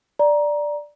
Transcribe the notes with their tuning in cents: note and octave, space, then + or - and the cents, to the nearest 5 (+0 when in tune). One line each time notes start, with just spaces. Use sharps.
D5 +0 A#5 +20